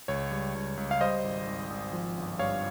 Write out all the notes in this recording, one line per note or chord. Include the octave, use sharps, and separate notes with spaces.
C#2 C#5
G3
C#2
C#2
F5
G3 C5 D#5
G#1
G#1
G#1
F3
G1
G2 C#5 F5